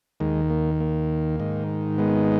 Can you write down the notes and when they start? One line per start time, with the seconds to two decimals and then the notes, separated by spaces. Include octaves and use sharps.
0.20 D#2 D#3 G#3
0.50 A#3
0.80 A#3
1.40 G#2 D#3
1.98 G#3 B3